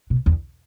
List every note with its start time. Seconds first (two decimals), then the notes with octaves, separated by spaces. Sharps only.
0.10 B2
0.26 E2